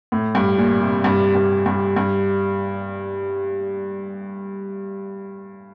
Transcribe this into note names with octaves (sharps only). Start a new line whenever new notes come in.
A2
G2
A#2
C3
G2
G2
G2
G2